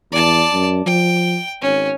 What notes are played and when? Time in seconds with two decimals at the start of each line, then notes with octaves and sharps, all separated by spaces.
0.12 E2 D5 A5
0.53 F#2
0.86 F3 G5
1.61 G#1 C#4